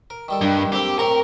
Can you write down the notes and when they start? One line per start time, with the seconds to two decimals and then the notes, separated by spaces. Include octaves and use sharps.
0.10 A#4
0.28 D#3 G3 A4
0.41 G2
0.73 A#3 C4 G4 A4
0.99 A2 C4 A#4 C#6